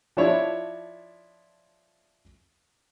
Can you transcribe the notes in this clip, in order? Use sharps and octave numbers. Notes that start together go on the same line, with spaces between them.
F3 D4 E4 C#5